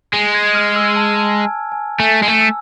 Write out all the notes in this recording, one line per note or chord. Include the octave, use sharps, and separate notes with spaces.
G#3
G#6
F6
E6
A5
A5
G#5
G#5
A3 G#5
G#3
A3
E6